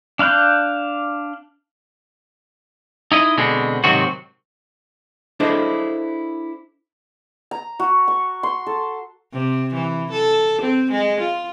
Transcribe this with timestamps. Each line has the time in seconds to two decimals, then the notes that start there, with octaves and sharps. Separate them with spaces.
0.19 D4 F5 B5 F#6 G6
3.12 D#4 E4 D#5
3.38 B2 D3 G#3 C4
3.84 G#2 C3 D#3 F#3 C4 F#4
5.40 D4 E4 G#4 A4 C5 D#5
7.51 A#5
7.79 F#4
8.08 C#6
8.43 C6
8.67 A4
9.33 C3
9.74 E3
10.11 A4
10.62 C4
10.91 G#3
11.21 F4